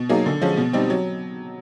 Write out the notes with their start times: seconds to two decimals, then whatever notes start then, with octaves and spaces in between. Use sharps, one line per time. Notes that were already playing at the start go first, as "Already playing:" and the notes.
Already playing: B2
0.09 F#3 A#3 D#4 G#4
0.26 D3
0.42 F3 G#3 C#4
0.57 B2
0.73 G3 C4 D#4
0.90 F#3